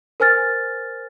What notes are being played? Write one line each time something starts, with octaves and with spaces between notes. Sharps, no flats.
A#4 C5 G#5 F6 A6